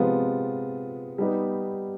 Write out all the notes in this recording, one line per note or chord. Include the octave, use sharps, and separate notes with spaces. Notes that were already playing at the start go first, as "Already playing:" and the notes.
Already playing: C3 F3 G#3 B3 F4
G3 B3 D#4 G4